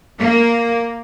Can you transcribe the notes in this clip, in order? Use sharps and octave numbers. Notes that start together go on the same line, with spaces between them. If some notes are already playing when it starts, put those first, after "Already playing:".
A#3